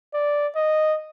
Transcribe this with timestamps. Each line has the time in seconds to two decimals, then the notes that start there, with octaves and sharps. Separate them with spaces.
0.14 D5
0.56 D#5